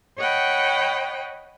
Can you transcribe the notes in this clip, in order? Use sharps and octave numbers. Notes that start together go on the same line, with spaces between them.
C#5 D#5 F#5 G5 B5